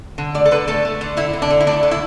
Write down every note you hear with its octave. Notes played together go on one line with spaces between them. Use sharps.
D3
A3 D5
A4
D3 B4
A3 A4
A3
D3
D3 E4
D3
D4
D3
E4
A3 D4
D3
E4